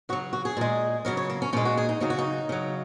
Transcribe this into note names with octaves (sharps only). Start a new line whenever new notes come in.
C#3 F#3 F#4
F#4
G#4
A#2 G#3
C#3 F#3 A#4
C#5
A#3
C#4
A#2 G#3 C#4
F#4
G#4
D#4
C#3 F#3 D#4
F#4
D#4
C#3 F#3